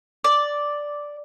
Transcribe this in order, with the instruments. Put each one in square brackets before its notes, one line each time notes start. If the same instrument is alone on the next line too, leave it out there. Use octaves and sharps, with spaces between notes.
[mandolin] D5